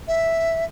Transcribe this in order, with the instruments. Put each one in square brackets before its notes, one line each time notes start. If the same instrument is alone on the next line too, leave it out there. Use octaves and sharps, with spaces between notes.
[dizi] E5